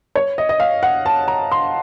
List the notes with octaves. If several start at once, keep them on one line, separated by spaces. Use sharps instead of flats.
C#5
D#5
D#5
F5
F#5
A5
A#5
C6